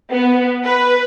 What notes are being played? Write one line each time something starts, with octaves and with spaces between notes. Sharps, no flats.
B3
B4